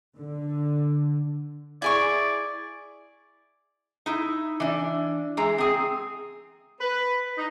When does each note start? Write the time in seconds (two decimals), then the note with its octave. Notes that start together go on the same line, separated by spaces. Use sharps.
0.17 D3
1.82 E4 G#4 D5 C#6
4.06 D#4 E4
4.60 E3 D4
5.37 E3 G#3 A#5
5.58 C4 G#4
6.80 B4
7.37 D#4